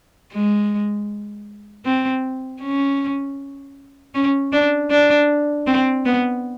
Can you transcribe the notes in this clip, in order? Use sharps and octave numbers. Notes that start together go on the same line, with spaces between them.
G#3
C4
C#4
C#4
D4
D4
C4
B3